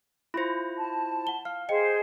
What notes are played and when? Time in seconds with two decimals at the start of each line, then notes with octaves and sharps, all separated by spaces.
0.34 E4 F4 C5 B5 A#6
0.78 A5
1.27 F#5 G7
1.45 F5 F6
1.69 G#4 C5 D#5 G5 C#7